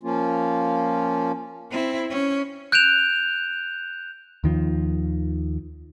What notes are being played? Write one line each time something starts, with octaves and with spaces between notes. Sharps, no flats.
F3 A#3 C#4 F4
C4 E4
C#4
F#6 G6 D7 E7 F7
D#2 D#3 F3